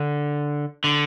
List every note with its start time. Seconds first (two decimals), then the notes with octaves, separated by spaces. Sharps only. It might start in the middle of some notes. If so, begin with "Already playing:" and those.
Already playing: D3
0.84 D3